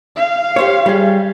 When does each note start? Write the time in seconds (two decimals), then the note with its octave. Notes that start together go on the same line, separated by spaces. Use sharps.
0.17 F5
0.56 G4 C5 C#5
0.86 G3 G#4